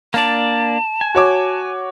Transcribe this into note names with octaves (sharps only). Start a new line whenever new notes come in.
A#3 D4 D5 A5
G#5
F#4 C#5 D6